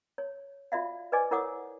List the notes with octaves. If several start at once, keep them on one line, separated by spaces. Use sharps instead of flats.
C#5
F4 F#4 D5 E5 F5
B4 C5 D5 D#5 G#5 D6
E4 A#4 C#5 F#5 D6 D#6